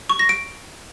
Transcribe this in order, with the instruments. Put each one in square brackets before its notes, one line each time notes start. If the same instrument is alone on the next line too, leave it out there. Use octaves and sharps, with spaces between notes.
[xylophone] C#6
A#6
D7